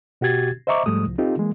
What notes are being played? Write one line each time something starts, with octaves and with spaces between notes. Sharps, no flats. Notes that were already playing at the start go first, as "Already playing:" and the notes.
B2 F#4 G4 G#6 A6
C5 D#5 E5 A#5 C#6 D6
G#2 F3 G3 A3 D#6
C2 F3
C4 D#4 F4 G4 A4
E3 G#3 A#3